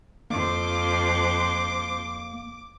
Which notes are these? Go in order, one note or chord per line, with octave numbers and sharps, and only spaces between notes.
F2 A#3 C5 D6